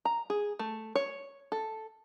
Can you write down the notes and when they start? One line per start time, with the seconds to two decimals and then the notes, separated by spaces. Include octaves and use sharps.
0.05 A#5
0.30 G#4
0.59 A3
0.95 C#5
1.52 A4